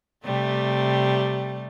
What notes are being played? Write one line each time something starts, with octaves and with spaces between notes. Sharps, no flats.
C3 G3 A3